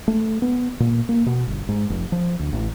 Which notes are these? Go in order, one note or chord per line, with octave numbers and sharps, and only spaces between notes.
A3
B3
A#2
A#3
B2
G1
G#2
F1
F3
D2
A1